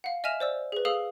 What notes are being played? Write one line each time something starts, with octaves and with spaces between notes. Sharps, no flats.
F5 F#5
D#5 E5 G#5 F6 E7 F7
C5 D5 E6
G#4 B4
G#4 A4 F5 D#6 E6 F7